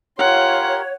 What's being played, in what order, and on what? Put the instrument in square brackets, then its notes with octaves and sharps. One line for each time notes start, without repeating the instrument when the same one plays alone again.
[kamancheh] F4 C6 [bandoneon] G4 A#4 [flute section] C#5 [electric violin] F#5